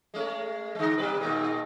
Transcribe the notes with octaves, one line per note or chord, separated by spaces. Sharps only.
G#3 A3 C#4
D3 G#3
B2 G3 B4
A#2 D#3 G#3